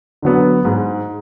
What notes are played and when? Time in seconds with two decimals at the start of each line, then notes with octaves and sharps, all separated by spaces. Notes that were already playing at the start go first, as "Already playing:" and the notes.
0.22 D3 F#3 B3
0.65 G#2